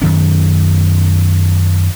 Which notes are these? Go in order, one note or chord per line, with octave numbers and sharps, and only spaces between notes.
F#2 D#3 C#4